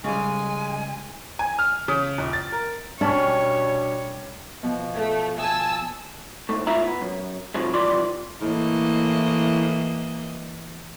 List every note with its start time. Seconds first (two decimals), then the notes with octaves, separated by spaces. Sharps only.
0.04 C#3 G3 G#3 G#5
1.39 G#5
1.59 F6
1.88 C#3
2.18 D#1
2.33 A6
2.52 A#4
3.01 B2 G3 C#4 D4 C#5
4.63 B2 F3
4.95 A3
5.39 G#5 A5 D#6 E6
6.49 G#2 B2 A3
6.67 B2 G#3 E4 F4 E5 A#5
6.83 B3
7.01 F#2
7.54 C2 A2 C3 F3 F#3 G#3
7.73 C2 E3 F3 G3 D5 C6
8.41 A2 E3 A#3 D#5